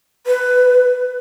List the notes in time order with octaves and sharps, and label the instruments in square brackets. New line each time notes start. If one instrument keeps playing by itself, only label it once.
[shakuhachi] B4